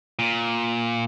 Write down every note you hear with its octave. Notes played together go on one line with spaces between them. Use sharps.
A#2